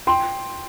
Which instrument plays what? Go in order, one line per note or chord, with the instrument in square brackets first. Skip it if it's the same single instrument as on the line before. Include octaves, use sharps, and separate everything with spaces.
[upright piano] G5 C6